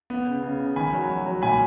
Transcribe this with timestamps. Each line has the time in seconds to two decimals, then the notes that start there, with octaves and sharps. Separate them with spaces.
0.10 B3
0.26 C#3
0.43 C#3
0.60 C#3
0.76 D#3 G#5 B5
0.93 F#3
1.10 F#3
1.26 F#3
1.42 A#2 G#5 B5